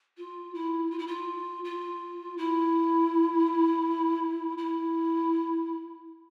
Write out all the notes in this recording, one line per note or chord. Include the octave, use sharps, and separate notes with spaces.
F4
E4
F4
E4
F4
F4
E4
E4